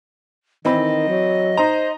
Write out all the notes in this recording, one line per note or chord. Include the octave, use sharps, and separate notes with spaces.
D#3 E3 C4 D#5 B5
F#3
D#4 C5 A#5